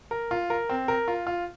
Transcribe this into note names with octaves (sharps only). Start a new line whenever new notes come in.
A#4
F4
A#4
C4
A#4
F4
F4